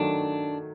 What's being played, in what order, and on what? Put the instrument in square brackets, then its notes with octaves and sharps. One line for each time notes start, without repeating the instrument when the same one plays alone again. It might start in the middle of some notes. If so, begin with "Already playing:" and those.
Already playing: [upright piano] D#3 F#3 A3 [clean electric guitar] D4